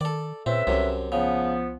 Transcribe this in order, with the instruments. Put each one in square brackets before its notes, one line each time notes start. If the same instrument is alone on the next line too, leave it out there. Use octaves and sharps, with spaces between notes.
[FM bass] D#3 [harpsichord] A4 D5
[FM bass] A#2 [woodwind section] C#3 B4 E5 [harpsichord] C4
[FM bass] C2 [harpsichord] F#2 C3
[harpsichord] C#3 [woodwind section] F3 B3